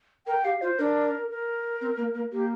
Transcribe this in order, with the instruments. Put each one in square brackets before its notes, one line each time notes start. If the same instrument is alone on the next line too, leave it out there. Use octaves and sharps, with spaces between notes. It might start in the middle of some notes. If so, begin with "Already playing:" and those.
[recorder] A#4 [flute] G5
[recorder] G4 [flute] F5
[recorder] F4 [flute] C5
[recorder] D4 [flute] A#4
[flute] A#4
[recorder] C4
A#3
A#3
[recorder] A#3 [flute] G4